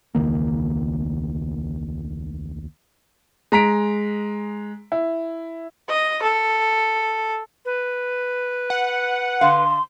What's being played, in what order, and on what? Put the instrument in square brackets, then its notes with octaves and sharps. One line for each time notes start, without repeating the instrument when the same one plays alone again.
[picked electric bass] E1 C#2 D#3 A#3
[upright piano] G#3 A#5 B6 D7
E4
[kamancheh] D#5
A4
[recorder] B4
[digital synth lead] F#5
[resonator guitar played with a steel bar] D3 F5 [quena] C6